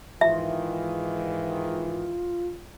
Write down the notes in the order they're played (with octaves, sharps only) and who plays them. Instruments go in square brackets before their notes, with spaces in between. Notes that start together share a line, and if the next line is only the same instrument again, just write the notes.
[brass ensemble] G#2 D#3 E3 [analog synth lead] F4 [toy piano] E5